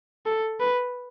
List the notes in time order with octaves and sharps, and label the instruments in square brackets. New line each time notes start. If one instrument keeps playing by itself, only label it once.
[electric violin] A4
B4